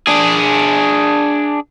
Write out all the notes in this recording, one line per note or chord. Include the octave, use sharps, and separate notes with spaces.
D4 G#4